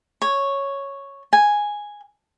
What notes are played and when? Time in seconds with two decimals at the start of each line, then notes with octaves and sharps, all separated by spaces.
0.22 C#5
1.33 G#5